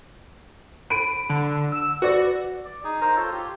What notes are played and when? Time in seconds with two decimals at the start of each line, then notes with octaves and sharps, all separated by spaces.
0.90 B5 D7 D#7
1.29 D3
1.72 E6
2.02 F#4 B4 D5
2.65 D5
2.84 D#4 G#4 G#5
3.01 D#4 A#4 C5 A#5
3.16 F4 A4 C5 C#5
3.31 F4 G4